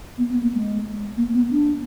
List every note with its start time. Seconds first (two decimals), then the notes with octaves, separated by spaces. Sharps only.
0.18 B3
0.31 B3
0.43 A#3
0.55 G#3
1.17 A#3
1.34 B3
1.51 D4